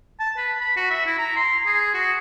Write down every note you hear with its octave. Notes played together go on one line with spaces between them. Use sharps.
A5
B4
B5
F#4
E5
E4
A#5
C6
G#4
F#4